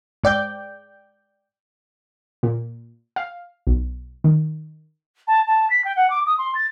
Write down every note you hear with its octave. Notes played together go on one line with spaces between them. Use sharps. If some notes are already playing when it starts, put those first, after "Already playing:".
G#2 D5 G5 G6
A#2
F5
B1
D#3
A5
A5
B6
G5
F#5
D6
D#6
C6
A6